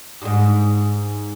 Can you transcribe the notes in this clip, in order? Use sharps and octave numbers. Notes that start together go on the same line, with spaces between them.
G2
G#2